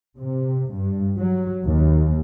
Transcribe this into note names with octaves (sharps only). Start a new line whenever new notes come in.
C3
G2
F#3
D#2